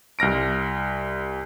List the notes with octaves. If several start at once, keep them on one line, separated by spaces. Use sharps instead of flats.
C2 F6 A#6 D7